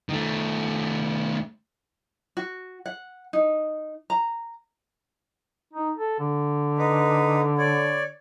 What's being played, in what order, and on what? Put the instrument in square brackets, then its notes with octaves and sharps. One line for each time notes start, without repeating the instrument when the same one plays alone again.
[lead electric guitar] D#3 A3
[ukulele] F#4
F#5
D#4
A#5
[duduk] D#4
A4
D3
[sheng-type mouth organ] D#4 B4
C#5 D5